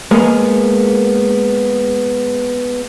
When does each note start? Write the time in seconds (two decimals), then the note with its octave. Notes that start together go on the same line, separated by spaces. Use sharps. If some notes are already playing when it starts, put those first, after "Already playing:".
0.11 G#3 A#3 B3